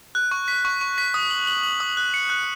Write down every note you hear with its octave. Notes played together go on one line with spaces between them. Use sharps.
F#6
C#6
B6
C#6
C#6
B6
D#6
F#7
F#7
F#7
D#6
F#6
C#7
F#6